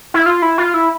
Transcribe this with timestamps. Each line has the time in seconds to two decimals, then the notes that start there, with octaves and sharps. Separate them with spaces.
0.14 E4
0.26 F4
0.42 E4
0.58 F4
0.74 E4